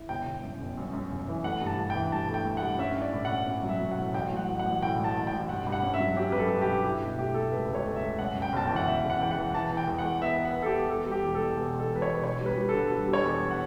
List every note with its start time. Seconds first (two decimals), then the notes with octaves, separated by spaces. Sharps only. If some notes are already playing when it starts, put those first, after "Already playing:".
Already playing: E4
0.09 G1 G5
0.27 G1
0.43 F#2
0.61 G1
0.77 F#2
0.93 F#2
1.11 G1
1.28 E3
1.44 A3 F#5
1.61 G2
1.66 A5
1.78 G2
1.90 G5
1.95 E3
2.12 G2 A5
2.28 A3
2.34 G5
2.45 A3
2.57 F#5
2.62 G2
2.79 C#4 E5
2.97 E4 D5
3.13 A2
3.25 F#5
3.30 C#4
3.47 C#4
3.63 F#3
3.69 E5
3.81 A2
3.91 F#5
3.98 A2
4.14 A1 G5
4.31 F#3
4.37 F#5
4.48 A1
4.59 F#5
4.66 A1
4.82 A2 G5
4.99 A1
5.04 A5
5.15 A1
5.27 G5
5.32 A1
5.49 G2 F#5
5.67 G2
5.72 F#5
5.83 C#4
5.94 E5
6.00 F#3
6.16 C#4 G4
6.32 F#3 B4
6.39 A4
6.50 G2
6.61 G4
6.68 G2
6.85 E4 G4
7.02 B2
7.18 A3 G4
7.34 A3 A4
7.52 C#2 B4
7.68 C#2
7.75 C#5
7.85 A3
7.96 E5
8.02 C#2
8.19 F#2 F#5
8.36 F#2
8.42 G5
8.53 G1 A5
8.66 E3 G5
8.76 F#5
8.86 G1 E5
9.03 C#3
9.10 F#5
9.21 E3 G5
9.31 F#5
9.38 E3
9.54 E3 A5
9.71 E3
9.77 G5
9.87 E2
9.98 F#5
10.05 E2
10.21 B3 E5
10.38 B3
10.45 F#5
10.56 B3
10.62 A4
10.66 G4
10.73 B3
10.89 E2 A4
11.06 G3
11.11 G4
11.23 E1
11.35 A4
11.40 B2
11.57 E2
11.74 B2
11.79 A4
11.90 E1
11.96 B4
12.02 C#5
12.08 B2
12.24 D3 C#5
12.41 G3
12.46 B4
12.58 G3
12.69 A4
12.75 D3
12.92 G3
13.08 G3
13.13 C#5
13.25 E2
13.51 F#5